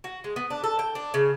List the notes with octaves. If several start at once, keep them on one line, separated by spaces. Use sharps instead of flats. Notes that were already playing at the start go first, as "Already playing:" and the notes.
F#4
G#3
B3
D4
A4
G5
D4
C#3